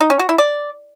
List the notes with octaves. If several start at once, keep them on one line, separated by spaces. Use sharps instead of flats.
D#4
C#4
F#4
E4
D5